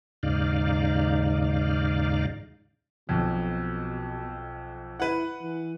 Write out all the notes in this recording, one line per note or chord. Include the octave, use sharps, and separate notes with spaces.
D#2 G#2 C#3 D#4 D5 F5
B1 F2 B2
E4 B4 F#5
E3